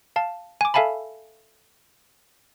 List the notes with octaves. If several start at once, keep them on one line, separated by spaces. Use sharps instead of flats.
F5 A5
G#5 D6
A4 E5 F5 G#5 A5 B5